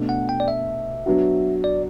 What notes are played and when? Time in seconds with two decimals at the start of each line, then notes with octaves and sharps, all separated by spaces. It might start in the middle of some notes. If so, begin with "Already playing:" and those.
Already playing: B2 A3 D4
0.09 F#5
0.29 G5
0.40 D5
0.48 E5
1.06 F#3 B3 D4 F#4
1.64 D5